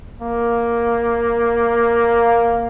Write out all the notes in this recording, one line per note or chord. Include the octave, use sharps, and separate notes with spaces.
A#3